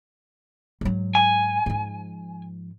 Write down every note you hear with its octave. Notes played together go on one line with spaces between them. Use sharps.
G#2 F#3
G#5
G#2 F3